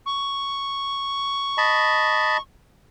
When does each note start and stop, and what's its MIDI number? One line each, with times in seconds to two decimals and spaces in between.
0.06 2.41 85
1.58 2.37 75
1.58 2.37 81
1.58 2.37 83